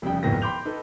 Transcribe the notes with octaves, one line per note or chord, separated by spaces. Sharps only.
F1 F2 C#3 G3 G5
D1 G#1 F2 A#2 B3 A#6
G5 B5 C6 D6 G6 F7
D#4 A4 B4